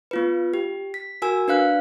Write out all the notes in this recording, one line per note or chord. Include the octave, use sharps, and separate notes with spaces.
B3 F4 B4
G4
B6
F#4 A#4 G#5 E6
D4 B4 F5 F#6